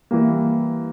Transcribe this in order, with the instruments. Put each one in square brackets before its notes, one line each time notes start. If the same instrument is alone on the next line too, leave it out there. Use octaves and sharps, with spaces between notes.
[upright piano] E3 G3 A#3